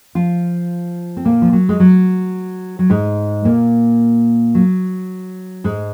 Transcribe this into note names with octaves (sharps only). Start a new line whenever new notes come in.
F3 F4
C4
A#2 A#3
F3
F#3
G#3
F#3
F#3
G#2 G#3
A#2 A#3
F#3
G#2 G#3